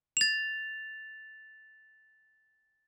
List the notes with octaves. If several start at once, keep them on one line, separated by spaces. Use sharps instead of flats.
A6 F7